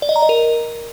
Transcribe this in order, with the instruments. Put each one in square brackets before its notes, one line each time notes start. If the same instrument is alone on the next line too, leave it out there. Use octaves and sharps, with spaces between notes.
[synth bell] D5
D#5
A#5
D#5
A#4